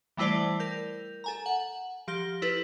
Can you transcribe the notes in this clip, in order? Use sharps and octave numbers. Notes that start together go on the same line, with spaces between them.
E3 G3 A3 E4 C5 D5
A#4 G6
A4 G#5 A#5
F#5
F3 G4 F6 A#6 G7
E4 A4 B4